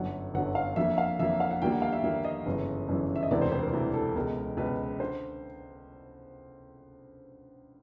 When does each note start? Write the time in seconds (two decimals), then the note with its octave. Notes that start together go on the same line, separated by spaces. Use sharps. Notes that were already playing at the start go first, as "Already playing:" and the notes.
Already playing: G1 F#2 D3 F#3 F#5
0.34 G1 F#2 D3 F#3 F#5
0.55 F5
0.76 F2 D3 F#3 A#3 E5
0.98 F5
1.19 F2 D3 F#3 A#3 E5
1.40 F5
1.51 F#5
1.62 D#2 D3 G3 A#3 G5
1.72 F#5
1.82 F5
1.93 E5
2.03 D#2 D3 G3 A#3 E5
2.24 D#5
2.45 G1 F#2 C#3 E3
2.88 G1 F#2 C#3 E3
3.15 E5
3.23 D#5
3.31 E1 D2 C3 E3 D5
3.42 C5
3.52 C5
3.62 A#4
3.73 E1 D2 C3 E3
3.94 A4
4.16 C#2 B2 G#3 A#4
4.57 C#2 B2 G#3 B4
5.00 D3 C5